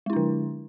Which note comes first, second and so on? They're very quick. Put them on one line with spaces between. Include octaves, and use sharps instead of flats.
G#3 E4 D4 D3